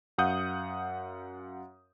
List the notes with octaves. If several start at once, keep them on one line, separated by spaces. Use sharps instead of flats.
F#2 F5 F#5 D#6 G6